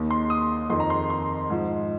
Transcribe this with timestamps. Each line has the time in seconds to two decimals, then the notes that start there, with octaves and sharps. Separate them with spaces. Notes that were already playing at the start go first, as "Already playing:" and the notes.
Already playing: D#2 D#3
0.11 C6
0.30 D#6
0.70 F2 D#3 C6
0.80 A#5
0.90 C6
1.10 C6
1.50 G#2 F3